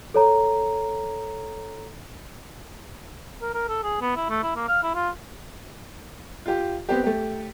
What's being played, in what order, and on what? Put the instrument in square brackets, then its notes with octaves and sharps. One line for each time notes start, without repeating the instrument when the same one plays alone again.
[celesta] A4 C#5 A#5
[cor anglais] A#4
A#4
A4
G#4
B3
E4
A3
E4
A#3
F5
E4
F4
[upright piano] F4 G4
B3 C4 G4
A3 G4